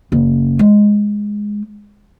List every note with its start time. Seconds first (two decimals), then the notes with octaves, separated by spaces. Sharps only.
0.12 F#1 C#3
0.59 G#3